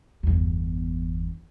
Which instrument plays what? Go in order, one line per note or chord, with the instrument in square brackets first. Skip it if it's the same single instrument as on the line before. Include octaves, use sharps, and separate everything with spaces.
[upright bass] G1 E2